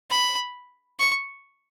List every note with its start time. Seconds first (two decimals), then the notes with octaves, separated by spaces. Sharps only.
0.10 B5
0.99 C#6